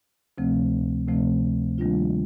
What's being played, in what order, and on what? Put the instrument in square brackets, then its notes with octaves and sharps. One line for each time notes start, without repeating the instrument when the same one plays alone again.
[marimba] D2 C3 F3 A3 C4
D2 C3 F3 A3 C4
D#3 G3 A#3 D4 F4